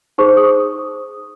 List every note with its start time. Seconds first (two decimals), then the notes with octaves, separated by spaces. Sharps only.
0.18 D#4 G#4 C5 C#6
0.37 D#6